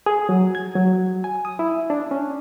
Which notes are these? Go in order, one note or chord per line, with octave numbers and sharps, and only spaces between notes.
G#4
F#3
G#6
F#3
G#5
D#6
E4
D4
C#4